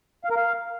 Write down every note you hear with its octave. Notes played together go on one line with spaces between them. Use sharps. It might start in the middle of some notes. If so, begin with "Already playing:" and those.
F5
A#4
F5